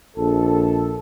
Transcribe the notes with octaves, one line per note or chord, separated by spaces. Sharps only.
A#1 A4